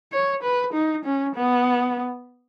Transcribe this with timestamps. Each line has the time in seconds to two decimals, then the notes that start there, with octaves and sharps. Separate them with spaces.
0.12 C#5
0.43 B4
0.74 D#4
1.05 C#4
1.35 B3